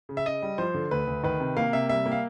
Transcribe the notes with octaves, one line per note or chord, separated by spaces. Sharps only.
C#3
E5
C#3 D#5
G3
F3 C5
D3
D2 B4
D2
D#3 B4
C3
A#3 F5
C3 E5
G3 E5
A#3
F5